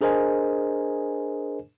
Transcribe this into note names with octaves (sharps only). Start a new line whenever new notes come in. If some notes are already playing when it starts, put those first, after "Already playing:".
D4 G#4 A#4 C5 D#5 G#5